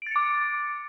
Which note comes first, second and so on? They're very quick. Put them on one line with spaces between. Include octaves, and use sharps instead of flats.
D7 A6 C#7 D6